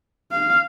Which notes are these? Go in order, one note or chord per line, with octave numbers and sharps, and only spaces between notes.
F5